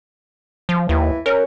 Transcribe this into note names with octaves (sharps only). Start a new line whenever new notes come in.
F3
D#2 E3
C#4 A#4